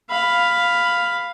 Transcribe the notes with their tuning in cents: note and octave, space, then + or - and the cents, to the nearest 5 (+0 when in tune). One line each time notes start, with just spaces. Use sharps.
F5 +0 B5 +10